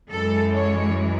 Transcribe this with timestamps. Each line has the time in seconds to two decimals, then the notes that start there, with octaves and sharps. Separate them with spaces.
0.10 F#2 E3 G#3 A4
0.53 C#5